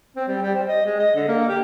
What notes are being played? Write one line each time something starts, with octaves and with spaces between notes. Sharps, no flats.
C4
G3
G3
C5
D#5
G#3
D#5
D3
A#3
G4